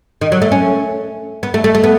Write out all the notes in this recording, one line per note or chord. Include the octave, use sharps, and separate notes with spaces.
D#3
F#3
A3
C#4
B3
A3
A3
A3
B3